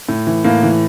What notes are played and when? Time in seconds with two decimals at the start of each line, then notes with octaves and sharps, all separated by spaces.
0.09 A2
0.27 E3
0.44 A2 A#3
0.63 E3